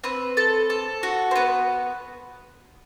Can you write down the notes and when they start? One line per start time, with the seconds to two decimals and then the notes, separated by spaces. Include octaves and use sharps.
0.04 C4 B4
0.37 A4
0.70 A4
1.03 F#4
1.31 C5
1.36 B3 B4